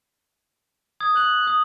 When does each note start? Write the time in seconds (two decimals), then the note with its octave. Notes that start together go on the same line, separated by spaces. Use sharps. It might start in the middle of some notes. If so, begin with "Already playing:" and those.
1.00 D#6 G#6
1.15 F#6 G#6 F#7
1.47 D#6